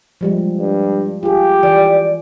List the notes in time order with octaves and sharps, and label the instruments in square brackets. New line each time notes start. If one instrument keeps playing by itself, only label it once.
[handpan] F3 G3 G#3
[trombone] G2
[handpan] F4 G#4 [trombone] G4
[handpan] E3 [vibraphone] D5